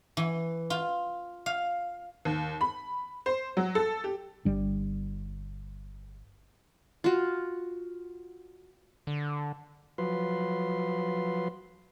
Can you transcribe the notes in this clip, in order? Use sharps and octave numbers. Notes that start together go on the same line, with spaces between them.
E3
F4
F5
D#2
B5
C5
F#3
A4
G4
G1 G3 D4
F4 F#4
D3
F3 F#3 B4 C6